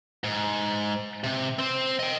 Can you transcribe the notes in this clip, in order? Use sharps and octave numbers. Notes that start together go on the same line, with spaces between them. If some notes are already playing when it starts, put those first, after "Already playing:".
G#2
C3
C4 C5
D#5 G5